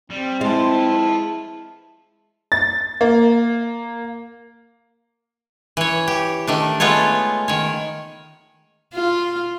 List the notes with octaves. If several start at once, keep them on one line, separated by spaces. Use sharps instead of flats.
G3 C4
F2 E3 G#3 E4 F5 A5
A6
A#3
E3 C#5
G4
D#3 A3 D4
G#3 A3 B3 F4 C#5
D#3 C#5
F4